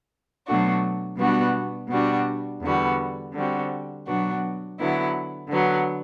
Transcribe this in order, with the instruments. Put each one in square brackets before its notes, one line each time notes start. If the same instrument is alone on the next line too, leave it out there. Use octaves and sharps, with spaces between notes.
[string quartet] B2 F#3 A3 D4 F#4
B2 G3 B3 D4 F#4
B2 G3 D4 F#4
E2 D3 G3 B3 F#4
D3 G3 C4 F#4
B2 F#3 B3 D4 F#4
D3 F#3 B3 E4
D3 F#3 B3